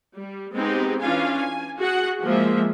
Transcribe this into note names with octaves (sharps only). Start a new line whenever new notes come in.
G3
G#3 B3 C4 D#4 G4 G#4
E3 C#4 D4 F4 F5 G#5
G#5
F#4 G#4 F#5
F3 G#3 A#3 E5